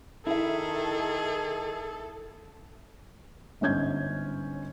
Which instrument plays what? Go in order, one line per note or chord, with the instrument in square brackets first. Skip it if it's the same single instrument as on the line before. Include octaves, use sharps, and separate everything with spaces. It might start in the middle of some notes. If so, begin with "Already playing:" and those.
[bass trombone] D#3 [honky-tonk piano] E4 E5 [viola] G#4 [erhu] A4
[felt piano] G1 G#2 C#4 G6 G#6